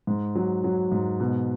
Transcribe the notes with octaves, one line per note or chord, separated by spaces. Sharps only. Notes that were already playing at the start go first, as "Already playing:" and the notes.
G#2
F#3
F#3
G#2
B2